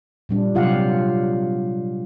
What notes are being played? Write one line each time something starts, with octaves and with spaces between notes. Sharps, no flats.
A#2 G3 D4
C3 F#3 F4 G4 F5 F#5